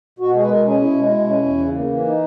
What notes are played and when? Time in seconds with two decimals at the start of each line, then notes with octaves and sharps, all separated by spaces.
0.19 B2 F#4
0.35 G#3 G#4
0.43 B4
0.50 B2 A#4
0.65 C#4 G#4
0.81 B2 E4
0.97 G#3
1.11 B2
1.27 C#4
1.43 E2
1.58 C#3
1.73 A#3
1.88 E3
2.04 D#4